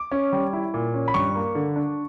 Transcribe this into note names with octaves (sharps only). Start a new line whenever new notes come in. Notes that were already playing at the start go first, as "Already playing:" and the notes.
Already playing: D6
C#4
G3
E4
A#2
C#4
B5
G2 C#6
A#3
D3
D4